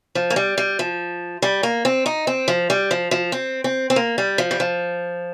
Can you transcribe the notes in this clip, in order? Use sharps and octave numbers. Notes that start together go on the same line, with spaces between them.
F3
A#3
G3
G3
F3
G3
A#3
C4
D#4
C4
F3
G3
F3
F3
C4
C4
C4
A#3
G3
F3
G3
F3